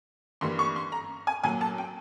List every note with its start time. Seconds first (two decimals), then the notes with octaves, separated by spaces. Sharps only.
0.41 G2 E3 G3 A#3 C6
0.59 C#6
0.76 C6
0.92 A#5
1.27 G#5
1.44 A#2 F#3 A#3 G#5
1.61 A5
1.78 G5